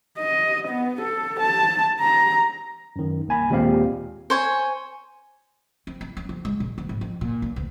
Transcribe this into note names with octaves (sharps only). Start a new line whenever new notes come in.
D#5
B3
A4
A5
A#5
F#2 D#3
C2 A#3 G#5 B5
D#2 A#2 G#3 C4 G4 F5
C5 C#5 G#5
C4
E4
C#4
F2
G#3
A#2
D2
G#2
F2
A#2
B1
D2